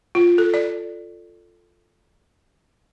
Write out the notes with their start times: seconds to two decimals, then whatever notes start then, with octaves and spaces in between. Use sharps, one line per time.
0.15 F4
0.38 A4
0.54 D5